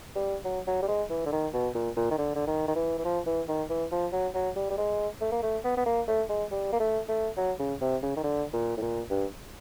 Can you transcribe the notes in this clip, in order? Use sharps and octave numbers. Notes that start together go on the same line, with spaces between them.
G3
F#3
F#3
G3
G#3
E3
D3
D#3
B2
A#2
A#2
D#3
D3
D3
D#3
D#3
E3
E3
F3
E3
D#3
E3
F3
F#3
F#3
G3
G3
G#3
A3
A#3
A3
B3
B3
A#3
A3
G#3
G3
A#3
A3
A3
F#3
C#3
C3
C#3
D#3
D3
A#2
A2
A#2
G2